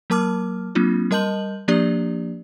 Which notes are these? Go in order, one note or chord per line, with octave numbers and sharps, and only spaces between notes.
F#3 A#3 A#4 A5 D6 F6
F#3 A#3 C4 D4 F4
G3 A#4 D#5 A5 G6 F#7
F3 A#3 D4 G4 D5